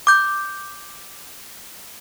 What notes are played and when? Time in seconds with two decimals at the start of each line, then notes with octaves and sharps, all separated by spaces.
0.07 D6 G6